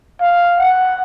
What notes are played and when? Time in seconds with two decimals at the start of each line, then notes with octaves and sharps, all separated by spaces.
0.20 F5
0.59 F#5